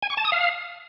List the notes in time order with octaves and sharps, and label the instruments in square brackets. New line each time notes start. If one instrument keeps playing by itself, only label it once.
[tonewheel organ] G#5
C#6
A5
D#6
F5